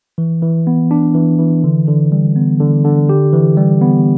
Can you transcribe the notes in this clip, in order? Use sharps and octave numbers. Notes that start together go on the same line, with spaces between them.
E3
E3
B3
D4
E3
E3
D3
D3
G3
B3
D3
D3
G4
E3
G3
B3